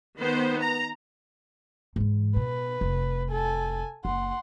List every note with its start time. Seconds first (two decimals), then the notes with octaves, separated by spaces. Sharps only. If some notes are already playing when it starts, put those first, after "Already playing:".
0.18 D#3 B3 C5
0.60 A#5
1.96 G#2 E3
2.36 B2 B4
2.81 F1
3.31 A4 G#5
4.05 F#1 F#5 C6